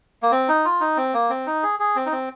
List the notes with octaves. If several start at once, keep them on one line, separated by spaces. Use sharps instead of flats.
A#3
C4
D#4
F4
D#4
C4
A#3
C4
D#4
G#4
G#4
C4
D#4
C4